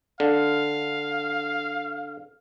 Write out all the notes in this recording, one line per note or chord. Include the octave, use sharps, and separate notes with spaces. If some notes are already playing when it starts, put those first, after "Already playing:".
D3 F5